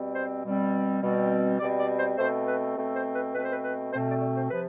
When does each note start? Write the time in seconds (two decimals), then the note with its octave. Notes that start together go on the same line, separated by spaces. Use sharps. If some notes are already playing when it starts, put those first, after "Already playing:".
Already playing: B2 G3 C4
0.14 C5
0.43 B2 G3 C4
1.02 B2 G3 C4
1.59 B2 G3 C4 D5
1.79 D5
1.99 C5
2.18 B2 A3 C4 C5
2.47 B4
2.75 B2 A3 C4
2.95 C5
3.15 B4
3.34 B2 A3 C4 B4
3.44 C5
3.52 B4
3.63 B4
3.92 B2 A3 C4 C5
4.07 D5
4.21 D5
4.36 C5
4.51 C3 F3 B4